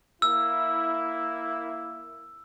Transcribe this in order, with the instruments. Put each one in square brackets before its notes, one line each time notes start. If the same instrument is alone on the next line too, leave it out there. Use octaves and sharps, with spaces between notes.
[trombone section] A#3 E4 [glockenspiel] E6